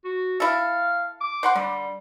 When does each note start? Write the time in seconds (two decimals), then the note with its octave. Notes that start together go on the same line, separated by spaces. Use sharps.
0.05 F#4
0.40 E4 A4 F5
1.21 D6
1.43 C5 F#5 C6
1.55 D3 G3